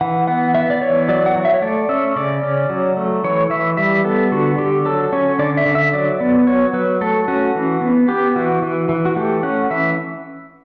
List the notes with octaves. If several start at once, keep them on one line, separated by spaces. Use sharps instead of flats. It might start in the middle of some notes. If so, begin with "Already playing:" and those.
E3 F#5
B3 F#5
B3 E5
D5
E3 C#5
F#3 D5
F#5
F#3
E5
C#5
A3 D5
C#4 E5
C#3 D5
C#4
F#3
A3
E3 C#5
E3 E5
G3 E5
B3 A4
D3 F#4
D3 G4
F#3 A4
C#4 C#5
D3 D5
E5
D3
E5
F#3 D5
B3
F#3 C#5
F#3 B4
A3 A4
C#4 F#4
E3
B3
B3 G4
E3 F#4
E3
E3
F#4
A3 G4
C#4 F#5
E3 E5